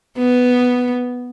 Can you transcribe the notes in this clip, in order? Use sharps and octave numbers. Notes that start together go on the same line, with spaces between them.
B3